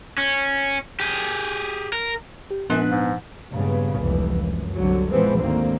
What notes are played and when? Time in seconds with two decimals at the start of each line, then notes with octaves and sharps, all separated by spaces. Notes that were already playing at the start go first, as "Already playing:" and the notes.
0.18 C#4
1.00 G4 G#4
1.92 A#4
2.51 G4
2.70 F#2 A#2 F3 G#3 B3 D4 B4
2.89 G#2
3.53 G2 A#2 C#3 G#3 B3
3.99 F1 C#2 G2 E3
4.41 F#2
4.76 C2 D3 F#3
5.11 A#2 E3 F3 G#3 B3 C4
5.40 D2 G#2 D3 D#3 A#3 C4